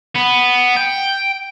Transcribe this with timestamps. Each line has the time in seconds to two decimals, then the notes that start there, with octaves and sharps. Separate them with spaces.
0.16 B3
0.77 G5